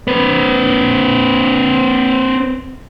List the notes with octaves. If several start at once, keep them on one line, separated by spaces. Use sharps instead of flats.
C4 B4